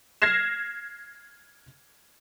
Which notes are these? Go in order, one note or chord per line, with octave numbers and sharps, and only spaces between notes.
F6 G#6 A#6 C7 E7